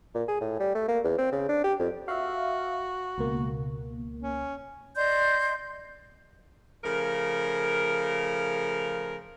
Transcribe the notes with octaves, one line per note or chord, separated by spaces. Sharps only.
A#2
G#4
A2
G3
A3
A#3
E2
C4
C#3
D4
G4
F2
F#4 E5 F5
C#2 B2 A#3
C#4
D5 D#5 C6 G6
C#3 F3 A3 A#4